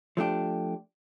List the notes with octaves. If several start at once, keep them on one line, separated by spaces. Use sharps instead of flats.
F3 A3 D4 G4